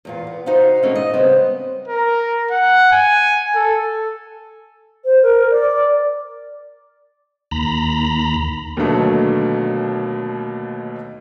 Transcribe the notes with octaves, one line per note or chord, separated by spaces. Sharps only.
E2 A#2 F4
B3
C3 D#4 F#4 C5 F5
B2 D#3 G#3 A3 C4 C#4
D#5
C#3 G3 B3 C4
A#4
F#5
G#5
A4
C5
A#4
D5
D#2 A#5 B5
D#2 B2 D3 F#3 A3